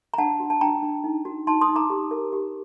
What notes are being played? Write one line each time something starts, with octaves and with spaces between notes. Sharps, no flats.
A#5
D4 F#5 A5
F#4
A5
D4 G5 A#5
D4
D#4
F#4
D#4 A5 C6
C6 D#6
D#4
A#5 D6
G4
A#4
G4